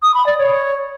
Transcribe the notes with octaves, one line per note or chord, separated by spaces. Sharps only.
D#6
B5
D5
C#5